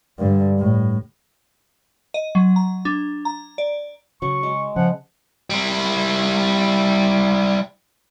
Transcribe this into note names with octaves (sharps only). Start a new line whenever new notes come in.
G2 D3
A2
D#5
F#3
A#5
D4
A#5
D5
C#3 F#3 C#6
G#3
C#3 F3 F#5
G3 E4